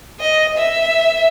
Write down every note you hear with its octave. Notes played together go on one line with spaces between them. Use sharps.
D#5
E5